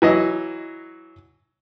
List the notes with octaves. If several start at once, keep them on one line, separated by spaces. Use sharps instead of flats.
E3 F#3 D#5